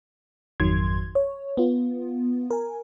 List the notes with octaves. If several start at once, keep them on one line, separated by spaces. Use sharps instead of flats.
G#1 F2 D#3 F#3 C6 G#6
C#5
B3 F4
A#4 G#5